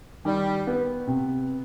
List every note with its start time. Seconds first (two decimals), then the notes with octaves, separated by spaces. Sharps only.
0.25 D#3 G3
0.67 B3
1.07 C3